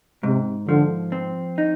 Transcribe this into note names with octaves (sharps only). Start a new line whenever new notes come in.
G#2 C3
D3 F3
C4
D#4